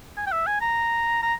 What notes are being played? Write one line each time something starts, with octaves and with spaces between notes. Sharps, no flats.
G#5
G5
E5
G#5
A#5
A#5